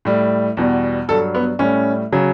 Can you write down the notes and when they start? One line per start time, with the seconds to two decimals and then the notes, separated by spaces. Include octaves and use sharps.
0.05 A2 G3
0.57 E2 B2 G3
1.08 G2 F#3 A4
1.35 B3
1.59 A2 G3 C#4
2.12 C#3 F#3